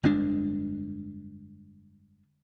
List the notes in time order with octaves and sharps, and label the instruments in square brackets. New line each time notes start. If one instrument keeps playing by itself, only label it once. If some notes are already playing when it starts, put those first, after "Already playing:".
[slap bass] G1 F2 G#3 D4